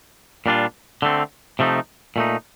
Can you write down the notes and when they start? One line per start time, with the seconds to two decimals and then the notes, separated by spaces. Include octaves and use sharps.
0.46 A#2 G3 D4 F4
1.02 D3 A3 C4
1.59 C3 F3 A3 D#4
2.16 A#2 A3 D#4